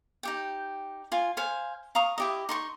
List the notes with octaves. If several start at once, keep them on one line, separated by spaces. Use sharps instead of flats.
D#4 G4 G5
F4 G#5
C5 F5 G#5
F5 A#5 C#6 D#6
E4 G4 D#5
D#4 C6 C#6